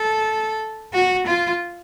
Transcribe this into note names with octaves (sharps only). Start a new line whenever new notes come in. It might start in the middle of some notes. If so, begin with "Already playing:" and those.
Already playing: A4
F#4
F4